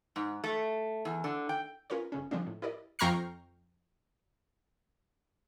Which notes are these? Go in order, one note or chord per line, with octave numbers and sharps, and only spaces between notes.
G#2
A3
E2
D3
G5
C#4 F4 A#4 B4 C#5
G1 C#3 C#4
D3 F3 G3 G#3 C4 D4
A2
E4 G4 A#4 D5 D#5
F2 G5 A#5 C#6 F6 C7